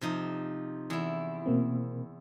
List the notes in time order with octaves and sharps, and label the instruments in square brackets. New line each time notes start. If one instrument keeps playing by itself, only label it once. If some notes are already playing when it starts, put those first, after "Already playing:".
[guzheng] C3 F3 D#4
E2 E4
[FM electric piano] B2 A#3 C4